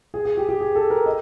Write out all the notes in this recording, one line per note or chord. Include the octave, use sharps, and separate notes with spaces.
G#4
G#4
G4
G4
G#4
A4
A#4
D#5